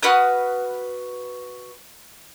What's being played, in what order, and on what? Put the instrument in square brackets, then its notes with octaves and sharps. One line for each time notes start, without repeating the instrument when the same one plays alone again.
[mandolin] F#4 B4 D#6 F6